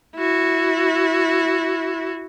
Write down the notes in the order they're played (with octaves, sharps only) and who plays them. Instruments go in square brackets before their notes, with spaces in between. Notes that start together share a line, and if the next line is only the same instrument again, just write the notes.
[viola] E4 F#4